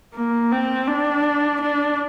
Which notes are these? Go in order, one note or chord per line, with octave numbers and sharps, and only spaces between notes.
A#3
C4
D4
D4